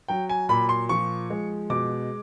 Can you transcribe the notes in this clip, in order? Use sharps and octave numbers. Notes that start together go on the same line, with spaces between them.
F#3 G5
G#5
A#2 B5
C6
F3 C#6
G#3
B2 D6